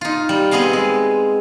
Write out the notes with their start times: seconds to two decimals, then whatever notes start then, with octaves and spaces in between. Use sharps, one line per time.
0.01 D#4 F4
0.29 G3
0.51 B3 C4 G#4 D#5 F5
0.73 G#3